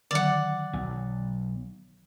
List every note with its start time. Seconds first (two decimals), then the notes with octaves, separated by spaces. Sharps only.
0.11 D3 D#3 F#3 D5 F#5
0.73 B1